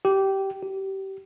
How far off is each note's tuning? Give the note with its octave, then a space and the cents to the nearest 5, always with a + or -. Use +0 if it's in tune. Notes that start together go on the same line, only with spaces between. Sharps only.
G4 -15
G4 -25